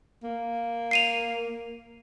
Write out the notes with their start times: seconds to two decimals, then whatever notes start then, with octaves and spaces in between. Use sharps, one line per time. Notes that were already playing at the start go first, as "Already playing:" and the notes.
0.23 A#3
0.91 C7 D#7 F7